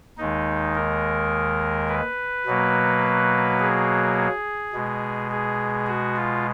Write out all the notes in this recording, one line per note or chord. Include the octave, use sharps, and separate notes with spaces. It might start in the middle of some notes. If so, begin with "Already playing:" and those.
D#2 D#3 G#3 D#4
A#4
B4
B2 F#3 A#3
G#4
B2 G#3
G#4
F#4
F4